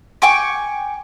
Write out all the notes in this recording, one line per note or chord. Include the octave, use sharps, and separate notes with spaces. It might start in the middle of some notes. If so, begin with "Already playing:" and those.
G5 G#5 C#6 D6